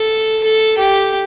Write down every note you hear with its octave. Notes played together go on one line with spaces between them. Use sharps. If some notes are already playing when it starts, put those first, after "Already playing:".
Already playing: A4
A4
G4